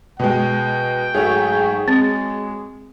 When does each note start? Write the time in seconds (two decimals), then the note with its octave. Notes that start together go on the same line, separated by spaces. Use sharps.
0.19 B2 G#3 G5
1.14 G#2 F#3 A3 F#4 G#4 C#5
1.88 G#3 C4